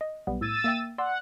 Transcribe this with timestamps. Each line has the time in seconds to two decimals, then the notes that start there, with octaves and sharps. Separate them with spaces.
0.01 D#5
0.27 B1 G3 B3
0.41 A2 E6 G#6 A6 D#7
0.64 A#3 E5 G5
0.98 D5 F#5 C6 E6